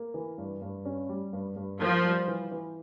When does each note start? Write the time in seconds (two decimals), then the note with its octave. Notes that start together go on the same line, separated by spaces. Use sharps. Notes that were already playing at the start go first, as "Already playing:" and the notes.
Already playing: A#3
0.14 E3
0.38 G2
0.62 G2
0.85 C#4
1.09 G3
1.33 G2
1.56 G2
1.80 F3 A#3
2.03 G3
2.27 E3
2.51 E3